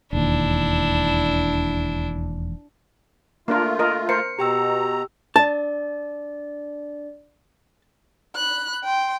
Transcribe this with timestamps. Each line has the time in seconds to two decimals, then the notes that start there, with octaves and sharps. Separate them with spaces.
0.13 E1 D#2 D4 E4
3.48 A3 A#3 D4 F4 A#4
3.79 A#4 D#5
4.09 A#4 C5 C7 C#7
4.39 B2 G4 G5 A#5 E6
5.36 D4 D5 A5
8.36 B5 F#6
8.84 G5 C6